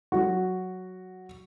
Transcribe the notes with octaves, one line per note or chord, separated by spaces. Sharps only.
F#3 F#4